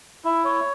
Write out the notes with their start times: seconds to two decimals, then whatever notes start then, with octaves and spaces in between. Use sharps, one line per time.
0.25 E4
0.45 C#5